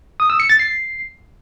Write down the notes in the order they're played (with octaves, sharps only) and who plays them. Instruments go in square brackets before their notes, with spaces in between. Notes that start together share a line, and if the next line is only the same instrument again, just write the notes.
[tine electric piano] D#6
E6
C#7
A6
C7